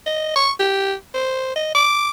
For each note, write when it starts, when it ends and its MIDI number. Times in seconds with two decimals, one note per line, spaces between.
0.06 0.33 75
0.35 0.51 85
0.59 0.93 67
1.14 1.50 72
1.55 1.73 75
1.75 2.10 86